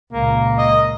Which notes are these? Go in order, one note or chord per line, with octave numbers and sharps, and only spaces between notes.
C#2 A#2 A#3
D#5